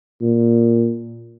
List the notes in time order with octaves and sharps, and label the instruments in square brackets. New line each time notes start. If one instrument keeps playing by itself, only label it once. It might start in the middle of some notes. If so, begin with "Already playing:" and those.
[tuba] A#2